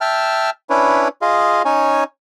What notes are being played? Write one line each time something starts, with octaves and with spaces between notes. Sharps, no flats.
E5 G5 A5 F6
C#4 D4 E4 B4 C#5
F4 G#4 D#5 F5
C#4 D#4 C#5 G#5